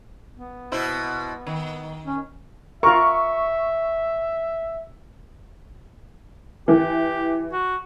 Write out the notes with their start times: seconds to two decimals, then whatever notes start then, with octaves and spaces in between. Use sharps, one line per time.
0.34 B3
0.72 B2 E4 C5
1.47 D#3
2.05 C#4
2.83 F4 A#4 E5 C#6
6.68 E3 G4
7.53 F#4